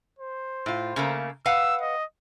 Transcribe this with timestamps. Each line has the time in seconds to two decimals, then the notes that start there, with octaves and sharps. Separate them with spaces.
0.19 C5
0.66 A2 F4
0.96 C#3 A3 A#3
1.46 B4 F5 F#5 E6
1.81 D#5